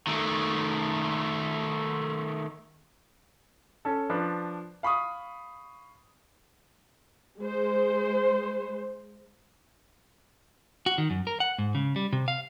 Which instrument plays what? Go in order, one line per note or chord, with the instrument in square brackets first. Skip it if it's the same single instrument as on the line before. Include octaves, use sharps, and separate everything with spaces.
[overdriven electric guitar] D#3 A3
[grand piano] C#4 A4
F3 D4 B4
F5 B5 C#6 D#6
[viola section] G#3 C5
[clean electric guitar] F#4
D#3
F#2
A#4
F#5
G#2
C#3
G3
C3
F5